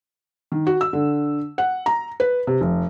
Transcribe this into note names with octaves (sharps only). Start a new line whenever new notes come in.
D#3
F#4
E6
D3
F#5
A#5
B4
C3
F1